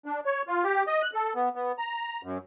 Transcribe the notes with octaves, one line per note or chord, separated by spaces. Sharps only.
D4
C#5
F4
G4
D#5
F#6
A4
B3
B3
A#5
F#2